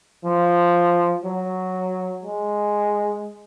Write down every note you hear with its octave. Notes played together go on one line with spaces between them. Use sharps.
F3
F#3
G#3